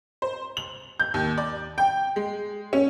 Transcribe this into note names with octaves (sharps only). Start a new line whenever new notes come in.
C5
F#7
G6
D#2
D5
G5
G#3
C#4